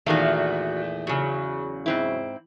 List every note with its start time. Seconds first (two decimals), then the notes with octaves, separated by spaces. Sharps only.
0.06 E2 A#2 D#3 A3 F#4 F5
1.07 C#3 F#3
1.86 G#2 C4 E4